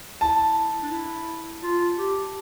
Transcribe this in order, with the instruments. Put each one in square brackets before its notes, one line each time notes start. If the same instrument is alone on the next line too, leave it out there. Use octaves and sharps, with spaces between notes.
[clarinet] E4 [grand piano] A5
[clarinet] D4
E4
F4
G4